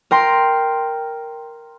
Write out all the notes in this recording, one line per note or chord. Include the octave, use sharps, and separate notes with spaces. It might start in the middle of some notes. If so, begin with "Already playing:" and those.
A#4 G5 C6